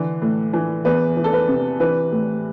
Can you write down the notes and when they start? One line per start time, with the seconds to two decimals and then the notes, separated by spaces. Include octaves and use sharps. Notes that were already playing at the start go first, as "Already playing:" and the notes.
Already playing: D3 E3
0.22 A2
0.53 E3
0.85 E2 B4
1.17 E3
1.24 A4
1.33 B4
1.48 C3
1.80 E3 B4
2.12 A2